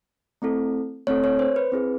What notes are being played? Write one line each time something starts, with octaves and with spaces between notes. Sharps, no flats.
A3 C4 E4 A4
A3 C4 E4 A4 C#5
C#5
C5
B4
C4 E4 G#4